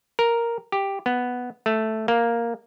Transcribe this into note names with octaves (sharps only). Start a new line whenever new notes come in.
A#4
G4
B3
A3
A#3